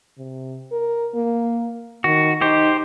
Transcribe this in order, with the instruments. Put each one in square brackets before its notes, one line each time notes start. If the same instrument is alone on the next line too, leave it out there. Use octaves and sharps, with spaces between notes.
[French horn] C3
A#4
A#3
[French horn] D#3 [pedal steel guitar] F#4
[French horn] D#4 [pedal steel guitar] G4 C5